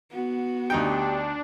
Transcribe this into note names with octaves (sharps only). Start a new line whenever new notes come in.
B3 F#4
D2 D4 D#4 G4 G5